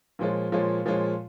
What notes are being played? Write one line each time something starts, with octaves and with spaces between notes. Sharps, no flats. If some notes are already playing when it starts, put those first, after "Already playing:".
A#2 F3 G#3 F4 C#5
A#2 F3 G#3 F4 C#5
A#2 F3 G#3 F4 C#5